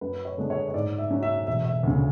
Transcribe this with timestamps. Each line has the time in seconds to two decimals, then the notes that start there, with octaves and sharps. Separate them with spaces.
0.01 F#2 B4
0.25 C#5
0.38 D3 G#3 B3 D4
0.50 C#5
0.69 C#5
0.74 G#2 D5
0.98 E5
1.10 F#3 C#4
1.23 E5
1.47 E1 E5
1.65 E5
1.83 D2 C#3